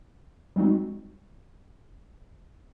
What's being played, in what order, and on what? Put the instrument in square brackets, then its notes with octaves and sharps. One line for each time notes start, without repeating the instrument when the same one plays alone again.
[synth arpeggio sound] G3 G#3 C4 D#4 F#4